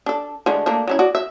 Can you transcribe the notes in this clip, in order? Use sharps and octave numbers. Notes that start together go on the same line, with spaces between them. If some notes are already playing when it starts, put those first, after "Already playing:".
D4 A4
D3 G#3 A3
A3 A#3 D4
F#3 C#4 E4
F#4 D5
E5